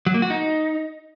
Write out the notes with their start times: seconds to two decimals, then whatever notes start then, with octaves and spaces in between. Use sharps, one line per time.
0.06 F#3
0.14 A#3
0.22 F#4
0.30 D#4